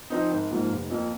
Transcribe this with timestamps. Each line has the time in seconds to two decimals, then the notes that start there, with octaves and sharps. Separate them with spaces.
0.10 F3 C4 D#4
0.31 G#1
0.51 G#2 F3 A#3 F4
0.71 F1
0.90 F2 F3 A#3